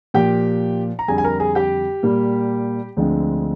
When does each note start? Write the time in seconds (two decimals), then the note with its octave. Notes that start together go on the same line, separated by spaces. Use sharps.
0.14 A#2 F3 A#3 G4 G5
0.99 A#5
1.08 F2 D3 G3 G#4 G#5
1.18 G#5
1.24 A#4 A#5
1.40 G#4 G#5
1.55 G4 G5
2.03 A#2 G3 A#3
2.97 D2 D3 F3 G#3 C4